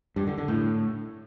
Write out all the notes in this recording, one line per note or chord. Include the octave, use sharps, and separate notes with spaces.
G2
D3
D3
A2